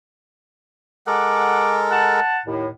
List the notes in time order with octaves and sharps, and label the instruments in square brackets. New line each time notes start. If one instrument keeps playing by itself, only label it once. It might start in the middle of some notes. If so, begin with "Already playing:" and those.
[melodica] G#3 A4 A#4 [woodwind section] F#5 D6
[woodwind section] F#5 A5
D#2 A2